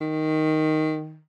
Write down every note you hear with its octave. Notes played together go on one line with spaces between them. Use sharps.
D#3